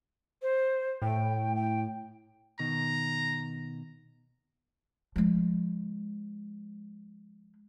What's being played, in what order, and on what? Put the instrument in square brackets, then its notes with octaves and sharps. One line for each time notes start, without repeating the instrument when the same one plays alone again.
[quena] C5
[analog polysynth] A2 [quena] G5
[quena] G5
[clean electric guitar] B2 D#3 [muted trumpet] A#5
[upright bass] F3 G#3